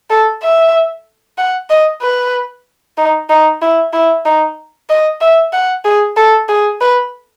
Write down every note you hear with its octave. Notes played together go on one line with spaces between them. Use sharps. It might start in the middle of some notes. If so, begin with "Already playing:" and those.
A4
E5
F#5
D#5
B4
D#4
D#4
E4
E4
D#4
D#5
E5
F#5
G#4
A4
G#4
B4